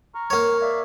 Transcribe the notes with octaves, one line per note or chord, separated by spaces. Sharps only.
A#5 C#6 F6
A#3 C#5
D5 E5 F5